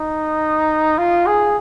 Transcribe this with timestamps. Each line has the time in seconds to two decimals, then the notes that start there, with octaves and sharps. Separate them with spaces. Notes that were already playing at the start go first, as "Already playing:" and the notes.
Already playing: D#4
0.98 F4
1.27 G#4